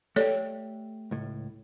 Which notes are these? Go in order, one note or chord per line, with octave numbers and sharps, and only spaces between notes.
A3 G4 A4 C#5 D5 G5
C#2 A2